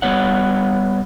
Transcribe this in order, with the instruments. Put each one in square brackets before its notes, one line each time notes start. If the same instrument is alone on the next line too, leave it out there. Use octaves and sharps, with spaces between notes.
[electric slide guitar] G3 B3 C#5 F#5